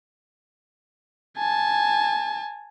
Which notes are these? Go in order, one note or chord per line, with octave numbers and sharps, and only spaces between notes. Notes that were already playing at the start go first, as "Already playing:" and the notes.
G#5 A5